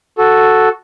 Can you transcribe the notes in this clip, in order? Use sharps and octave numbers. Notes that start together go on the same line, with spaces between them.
F#4 A4